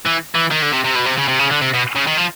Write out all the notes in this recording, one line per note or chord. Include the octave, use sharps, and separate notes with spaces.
E3
E3
D#3
D3
C3
C3
B2
C3
C#3
C3
C#3
D3
C3
B2
C#3
D#3
F3